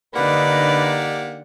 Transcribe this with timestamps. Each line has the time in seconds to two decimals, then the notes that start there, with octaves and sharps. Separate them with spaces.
0.15 D3 A#3 D#4 G4 B4 D5 F#5